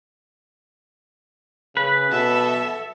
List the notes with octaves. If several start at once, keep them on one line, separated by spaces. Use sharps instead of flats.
C#3 B4
B2 A4 E5